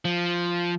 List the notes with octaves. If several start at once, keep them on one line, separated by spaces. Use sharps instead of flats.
F3